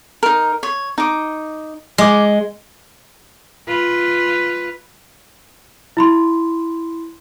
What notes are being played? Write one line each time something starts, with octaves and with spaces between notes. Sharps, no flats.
D#4 A#4
C#5
D#4 D6
G#3 D6 D#6
F4 B4
E4 B5 C6